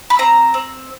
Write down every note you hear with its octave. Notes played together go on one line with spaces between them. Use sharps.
B5
C4 A#5
C4